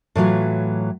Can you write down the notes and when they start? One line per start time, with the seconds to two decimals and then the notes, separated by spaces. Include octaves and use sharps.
0.15 A2 E3 F#3 F4